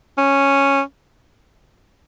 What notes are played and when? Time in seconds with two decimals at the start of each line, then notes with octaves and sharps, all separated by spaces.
0.18 C#4